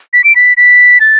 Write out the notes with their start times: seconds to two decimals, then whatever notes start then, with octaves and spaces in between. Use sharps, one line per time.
0.13 B6
0.24 D7
0.36 B6
0.57 B6
1.01 A6